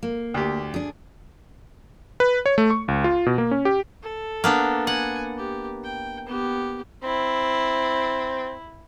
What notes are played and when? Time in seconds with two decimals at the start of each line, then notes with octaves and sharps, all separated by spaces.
0.03 A#3
0.34 D2 G4
0.74 D4 G#4
2.20 B4
2.46 C#5
2.58 A3
2.70 C#6
2.88 C#2
3.04 F4
3.26 B2
3.38 A#3
3.51 C#4
3.65 G4
4.03 A4
4.44 A#3 B3 D4
4.87 F#5 G#5
5.38 G4
5.84 G5
6.26 B3 G4
7.03 C4 E4